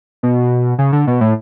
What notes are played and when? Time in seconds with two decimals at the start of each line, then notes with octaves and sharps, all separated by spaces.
0.23 B2
0.78 C#3
0.93 D3
1.07 B2
1.21 A2